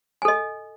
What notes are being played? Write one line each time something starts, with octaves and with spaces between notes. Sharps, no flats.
A4 D#5 G#5